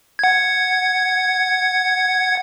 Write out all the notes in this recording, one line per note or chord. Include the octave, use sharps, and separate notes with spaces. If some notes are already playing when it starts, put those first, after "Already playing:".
F#5 G#6